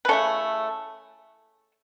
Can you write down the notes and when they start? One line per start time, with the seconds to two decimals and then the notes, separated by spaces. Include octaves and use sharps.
0.05 B4
0.08 C#3 A3 E4 A4 C#5